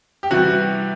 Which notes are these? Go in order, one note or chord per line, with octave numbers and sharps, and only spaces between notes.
G4
C3 E3 G3 F#4